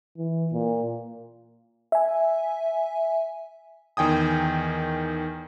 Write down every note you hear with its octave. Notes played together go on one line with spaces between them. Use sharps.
E3
A#2
E5 G#5
E2 D#3 G5 G#5 D#6